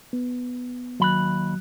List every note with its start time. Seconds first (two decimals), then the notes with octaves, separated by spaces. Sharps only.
0.13 B3
1.00 D#2 F#3 B5 F#6